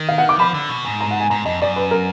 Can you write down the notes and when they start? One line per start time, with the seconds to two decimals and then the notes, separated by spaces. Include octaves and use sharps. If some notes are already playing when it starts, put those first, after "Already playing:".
Already playing: D#3
0.09 F5
0.18 F#5
0.29 D6
0.39 F3 B5
0.54 D3
0.69 B2
0.85 G#2
1.01 A#5
1.11 F#5
1.20 G#5
1.30 G#2 A#5
1.45 F2 D#5
1.61 F#2 D5
1.76 B4
1.91 A#4